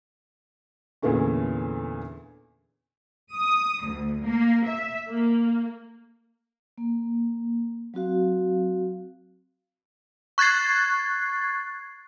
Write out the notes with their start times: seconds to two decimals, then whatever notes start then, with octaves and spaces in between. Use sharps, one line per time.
1.02 E2 A#2 D3 E3 A3 C#4
3.33 D#6
3.84 D2
4.24 A#3
4.65 E5
5.09 A#3
6.78 A#3
7.94 F#3 C4 F#4 F5
10.38 C#6 F#6 G#6 A6 C7